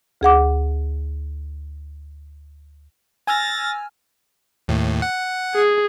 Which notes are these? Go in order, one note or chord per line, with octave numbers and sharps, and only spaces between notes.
D2 G#4 F#5 D6
G#5 E6 F6 A6 A#6
D#2 A2
F#5
G#4